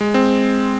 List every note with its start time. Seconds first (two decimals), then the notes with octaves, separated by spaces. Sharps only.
0.01 G#3
0.14 C4